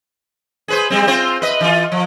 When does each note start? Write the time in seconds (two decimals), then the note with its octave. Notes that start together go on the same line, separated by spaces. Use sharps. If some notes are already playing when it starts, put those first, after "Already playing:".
0.68 G#4 B4 C5
0.90 G3 G#3 C4
1.07 C4 F4 C5
1.42 B4 D#5
1.61 E3 F4
1.92 F3